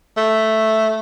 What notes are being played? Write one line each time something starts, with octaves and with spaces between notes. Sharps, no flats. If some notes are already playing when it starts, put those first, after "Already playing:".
A3